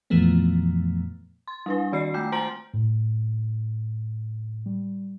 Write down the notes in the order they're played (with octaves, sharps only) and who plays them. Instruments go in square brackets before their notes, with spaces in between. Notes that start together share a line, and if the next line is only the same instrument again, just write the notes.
[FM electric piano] F2 A#2 E3 F3 A3 B3
[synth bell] C6
G3 D4 B4
D#3 F#4 D5 C7
G#3 A3 D6 G6
C5 G#5 A#5 C6 D7 F#7
[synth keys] A2
G3